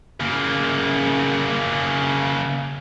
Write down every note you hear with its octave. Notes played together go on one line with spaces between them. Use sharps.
C#3 A#3